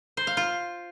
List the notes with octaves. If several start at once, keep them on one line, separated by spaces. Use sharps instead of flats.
C5
F5
F4